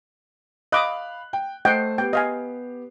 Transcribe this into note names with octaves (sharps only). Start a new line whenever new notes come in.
D#5 F5 B5 D6 D#6 F#6
G5
A3 C5 D#5 F#5 G5 C7
B3 G4 G5
D#5 F5 G#5